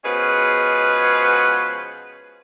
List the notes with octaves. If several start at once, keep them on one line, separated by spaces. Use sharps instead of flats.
B2 F3 G#3 C#4 G#4 B4